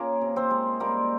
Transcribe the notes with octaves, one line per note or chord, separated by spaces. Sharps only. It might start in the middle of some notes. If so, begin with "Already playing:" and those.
Already playing: A#3 C#4 F4 G#4 A#4
C3
C4 C5
G#3
G3 A#3 A#4